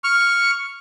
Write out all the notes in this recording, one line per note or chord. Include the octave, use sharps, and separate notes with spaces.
C#6 F6